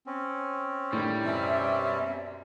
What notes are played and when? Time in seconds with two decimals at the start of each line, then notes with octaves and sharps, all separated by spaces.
0.07 C4 C#4
0.93 A2 D3 D#3 G3
1.25 F#2 B2 C4 C#4 E5